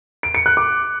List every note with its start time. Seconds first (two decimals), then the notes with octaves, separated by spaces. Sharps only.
0.23 D7
0.35 C#7
0.46 F#6
0.57 D6